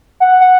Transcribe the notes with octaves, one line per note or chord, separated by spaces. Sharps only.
F#5
F#5